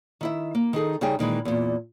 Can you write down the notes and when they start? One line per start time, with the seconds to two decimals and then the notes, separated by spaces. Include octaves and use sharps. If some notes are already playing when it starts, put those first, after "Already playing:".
0.21 D#3 E4 E5
0.55 A#3
0.73 D#3 D#4 G#4 A4
1.01 C#3 G3 D#4 G#4 G5 G#5
1.19 A#2 D#3 E3 G#3
1.45 E2 A#2